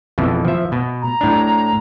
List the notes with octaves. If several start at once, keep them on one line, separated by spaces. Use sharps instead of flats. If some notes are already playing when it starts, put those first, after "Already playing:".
F2 B2 E3
F3 E5
B2
A#5
A2 D4